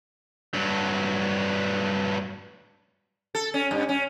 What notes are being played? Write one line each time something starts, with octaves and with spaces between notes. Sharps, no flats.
G2 F#3
A4
C#4
G2
C#4